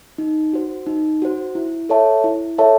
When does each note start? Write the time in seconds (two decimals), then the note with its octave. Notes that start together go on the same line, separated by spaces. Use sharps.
0.18 D#4
0.53 F#4 C5
0.86 D#4
1.22 F#4 C5
1.55 E4
1.89 A4 C#5 E5 A5
2.24 E4
2.58 A4 C#5 E5 A5